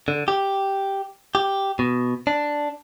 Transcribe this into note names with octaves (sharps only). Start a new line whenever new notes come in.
D3
G4
G4
B2
D4